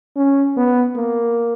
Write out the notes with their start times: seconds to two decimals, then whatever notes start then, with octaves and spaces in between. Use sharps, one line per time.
0.16 C#4
0.57 B3
0.97 A#3